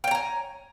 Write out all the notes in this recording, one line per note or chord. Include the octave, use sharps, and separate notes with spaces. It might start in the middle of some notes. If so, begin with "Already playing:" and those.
C#5 G5 G#5 A#5